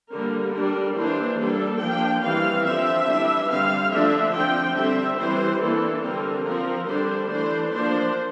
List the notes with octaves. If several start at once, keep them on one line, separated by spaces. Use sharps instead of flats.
D3 G3 A#3 A#4
G3 D4 A#4
E3 A#3 D4 C5
G3 A#3 D4 A4
F3 A#3 D4 G5
E3 G3 C4 F5
D3 F3 C4 E5
E3 G3 D4
D3 G3 C4 F5
D3 F3 A3 D4 E5
D3 F3 C4 G5
D3 G3 C4 E5
E3 G3 C4 C5
E3 A#3 D4 A4
D3 G3 C4 A#4
F3 C4 A#4
D3 G3 D4 C5
E3 A3 D4 C5
F3 A#3 D4 C5